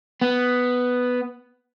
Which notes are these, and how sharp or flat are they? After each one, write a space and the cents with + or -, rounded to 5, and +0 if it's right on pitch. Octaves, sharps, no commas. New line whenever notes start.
B3 +5